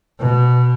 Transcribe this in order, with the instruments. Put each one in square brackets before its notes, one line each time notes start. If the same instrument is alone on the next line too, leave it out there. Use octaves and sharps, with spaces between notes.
[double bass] B2